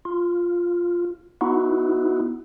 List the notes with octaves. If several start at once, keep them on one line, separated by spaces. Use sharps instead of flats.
F4
B3 D#4 E4 F#4